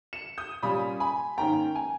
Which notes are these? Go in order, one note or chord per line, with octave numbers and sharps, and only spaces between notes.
C#7 E7
D#6 G6
A#2 G3 C#4 B5 D#6
G#5 B5
G#2 D#3 A#3 C#4 G5 A#5
G#5